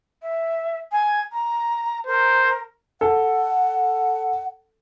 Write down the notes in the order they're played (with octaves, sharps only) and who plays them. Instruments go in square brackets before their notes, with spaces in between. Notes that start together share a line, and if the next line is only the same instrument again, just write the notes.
[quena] E5
G#5
A#5
[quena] A#4 [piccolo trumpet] C5
[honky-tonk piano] A4 [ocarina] F#5